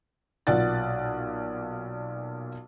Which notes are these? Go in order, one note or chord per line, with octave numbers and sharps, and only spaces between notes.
B1 A#2 D5 F#5 A6